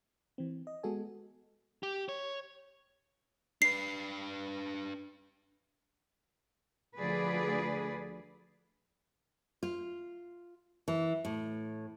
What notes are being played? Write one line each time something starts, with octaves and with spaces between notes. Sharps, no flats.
E3 C4
D#5
G#3 B3 F#4 A4 G#5
G4
C#5
D4 B4 C7
D2 D3 F3 G#4 B4 D5
F4
E3
A2